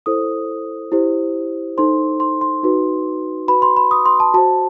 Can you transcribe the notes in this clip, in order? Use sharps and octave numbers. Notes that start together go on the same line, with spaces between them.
E4 A4 C5 D#6
E4 G4 C5
D#4 A4 C5 C6
C6
C6
D#4 F#4 B4
F#4 B4 B5
C6
B5
D#6
C6
A5
F#4 C5 A5